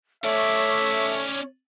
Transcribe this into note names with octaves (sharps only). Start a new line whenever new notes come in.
A3 C#4 C#5 D5 E5